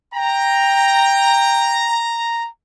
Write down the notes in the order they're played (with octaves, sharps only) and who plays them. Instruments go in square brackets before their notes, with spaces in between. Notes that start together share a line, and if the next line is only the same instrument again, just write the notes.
[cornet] G5 [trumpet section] A#5